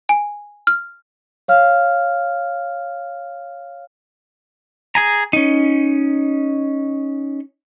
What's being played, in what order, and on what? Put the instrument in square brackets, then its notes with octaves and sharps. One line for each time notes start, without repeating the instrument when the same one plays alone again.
[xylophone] G#5
F6
[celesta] C#5 F5 F6
[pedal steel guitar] G#4 G#5 A#5
C#4 D#4